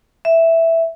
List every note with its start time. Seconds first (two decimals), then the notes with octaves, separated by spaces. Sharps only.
0.25 E5